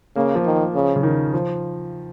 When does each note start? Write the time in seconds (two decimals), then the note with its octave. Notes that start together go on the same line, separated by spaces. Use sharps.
0.16 C#3 A#3
0.35 F3
0.45 D#3
0.75 C#3
0.96 C#3
1.03 D#3
1.34 F3